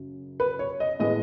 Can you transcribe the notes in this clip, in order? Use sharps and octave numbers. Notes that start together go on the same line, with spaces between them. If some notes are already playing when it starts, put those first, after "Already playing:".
Already playing: F#2 C#3
B4
C#5
D#5
A2 G#3 B3 D#5